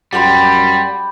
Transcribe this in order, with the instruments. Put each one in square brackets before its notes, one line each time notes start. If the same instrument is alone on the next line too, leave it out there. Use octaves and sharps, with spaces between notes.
[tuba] F#2 [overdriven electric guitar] G3 [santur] G4 G5 B5 [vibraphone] F#5 C6